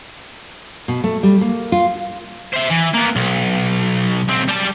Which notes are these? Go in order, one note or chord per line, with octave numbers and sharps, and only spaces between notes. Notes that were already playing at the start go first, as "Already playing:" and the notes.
B2
A3
G3
A#3
F4
C5 E5
E3
A#3 B3
B1
C#2 C4
G3 A5